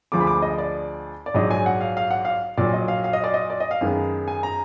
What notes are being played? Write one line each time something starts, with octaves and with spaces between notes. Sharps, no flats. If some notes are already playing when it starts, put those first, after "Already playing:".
D2 D3 F3 G#3 D6
B5
D6
D#5
D5
D5
A#1 G#2 F#3 D4 D#5
G#5
F#5
F5
F5
F#5
F5
A#1 A#2 F#3 D5
D#5
F5
F5
D#5
D5
D#5
D5
D#5
F5
F#2 D#3 G#3 B3
G#5
A#5